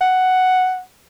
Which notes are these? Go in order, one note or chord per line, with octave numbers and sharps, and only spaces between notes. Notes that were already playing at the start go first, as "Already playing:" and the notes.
F#5